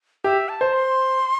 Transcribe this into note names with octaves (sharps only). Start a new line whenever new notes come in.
G4 E5
A5
C5
C6